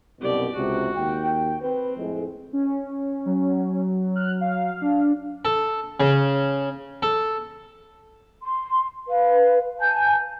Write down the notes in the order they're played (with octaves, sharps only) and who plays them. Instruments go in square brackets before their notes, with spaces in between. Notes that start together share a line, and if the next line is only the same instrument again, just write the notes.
[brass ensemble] C2 F#2 B2 [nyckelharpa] G4 D5
[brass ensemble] C#2 C3 [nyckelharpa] F#4
[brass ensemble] D#2 G5
[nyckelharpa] C4 [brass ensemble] B4
[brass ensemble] F2 A2 G#3
[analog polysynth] C#4
[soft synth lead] F#3
[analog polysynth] F6 F#6
F5
[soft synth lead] D4
[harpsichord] A4
C#3
A4
[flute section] C6
B4 F5
G#5 A5 G6